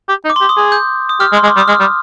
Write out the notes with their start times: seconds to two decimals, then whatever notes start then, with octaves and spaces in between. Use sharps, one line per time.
0.09 G4
0.25 D#4
0.30 D6
0.36 C6
0.41 G4
0.49 D#6
0.57 G#4
0.72 G6
1.09 D#6
1.20 G4 F6
1.32 G#3
1.37 C6
1.43 G#3
1.47 D6
1.56 G3 D#6
1.68 G#3 F6
1.80 G3